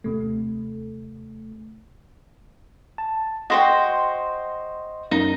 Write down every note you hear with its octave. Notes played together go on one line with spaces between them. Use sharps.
D#2 C3 A3
A5
F#4 C5 D#5 G5 C6
F#2 D#4